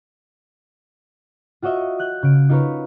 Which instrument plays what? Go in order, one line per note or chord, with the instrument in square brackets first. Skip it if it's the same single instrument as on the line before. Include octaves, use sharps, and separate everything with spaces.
[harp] F4 F#4 C#5 D#5 E5
D#6 F#6 G6
C#3 D7
D#4 F4 A#4 B4 C#5